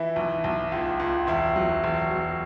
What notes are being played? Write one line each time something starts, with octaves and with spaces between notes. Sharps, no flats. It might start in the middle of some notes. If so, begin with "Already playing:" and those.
Already playing: E3 E4
B1
B1
C#2
C#2
E1 E4
F#3
E1
F#3